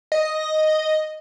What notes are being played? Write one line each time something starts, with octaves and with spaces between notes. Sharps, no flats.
D#5